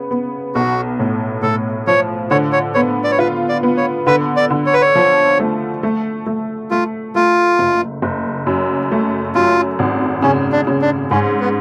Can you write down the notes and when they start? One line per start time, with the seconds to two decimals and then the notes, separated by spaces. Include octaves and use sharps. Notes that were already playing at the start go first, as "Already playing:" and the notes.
Already playing: C#3 B3
0.11 B3
0.55 B1 F#4
1.00 A2
1.42 A2 A4
1.87 F3 C#5
2.31 D3 C#5
2.52 C#5
2.74 B3 C#5
3.04 D5
3.12 C#5
3.19 F4 B4
3.49 D5
3.63 B3
3.77 C#5
4.07 D3 B4
4.37 D5
4.50 D3
4.66 C#5
4.74 B4
4.82 C#5
4.95 F3
5.40 A3
5.83 A3
6.26 A3
6.71 A3 F4
7.15 A3 F4
7.59 F#1
8.02 F#1
8.47 F#2
8.92 A3
9.35 F#2 F4
9.79 G#1
10.22 C#3 C#4
10.52 D4
10.67 C#3
10.82 D4
11.11 G#2 C#4
11.40 B3